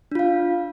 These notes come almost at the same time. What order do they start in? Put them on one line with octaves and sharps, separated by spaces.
D4 F4 F5